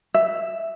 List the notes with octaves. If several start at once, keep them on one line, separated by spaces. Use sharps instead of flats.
E5